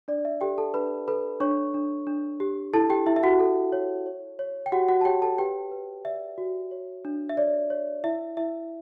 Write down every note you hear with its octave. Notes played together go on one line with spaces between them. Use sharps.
D4 D5
E5
G4 A4 G5
A4 A5
D4 B4 B5
A4 B4 B5
D4 C#5 C#6
D4
D4
G4
E4 A4 A5
G4 G5
E4 E5
E5
F#4 F#5
A4
C#5
C#5
C#5
G5
F#4 G4 F#5
F#4 F#5
A5
G4 C#5 G5
A4 A5
G4 B4 G5
B4
D5 E5
F#4
C#5
D4
E5
C#5 D5
C#5
E4 E5
E4 E5